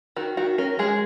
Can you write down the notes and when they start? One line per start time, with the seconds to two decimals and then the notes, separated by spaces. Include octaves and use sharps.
0.16 D#3 F#4
0.37 D#3 F#4
0.58 C#4 A#4
0.79 G#3 G#4